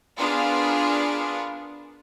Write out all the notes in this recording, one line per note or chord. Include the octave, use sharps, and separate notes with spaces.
B3 D4 F4 G#4 A#4